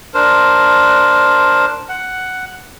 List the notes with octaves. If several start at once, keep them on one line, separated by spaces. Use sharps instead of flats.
D4 A#4 C5
F#5